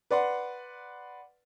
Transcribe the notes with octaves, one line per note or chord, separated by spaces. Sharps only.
B4 D5 F#5 C6